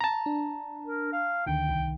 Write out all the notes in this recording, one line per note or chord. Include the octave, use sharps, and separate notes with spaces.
A5 A#5
D4
A#4
F5
D2 D3 D#3 G5
C2 D#3